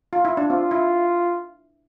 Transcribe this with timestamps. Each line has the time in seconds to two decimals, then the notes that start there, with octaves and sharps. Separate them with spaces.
0.13 F4
0.25 E4
0.37 D4
0.50 C4 F4
0.71 E4